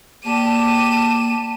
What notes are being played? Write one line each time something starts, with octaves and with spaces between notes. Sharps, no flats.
A#3 G4 D5 A5 D#7 E7